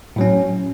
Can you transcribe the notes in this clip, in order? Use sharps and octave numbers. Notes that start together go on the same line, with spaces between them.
A2 F#3 C#4